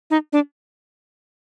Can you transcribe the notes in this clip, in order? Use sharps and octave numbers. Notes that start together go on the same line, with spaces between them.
D#4
D4